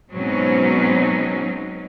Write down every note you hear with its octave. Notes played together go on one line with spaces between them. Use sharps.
G#2 B2 F#3 C4 C#4 D#4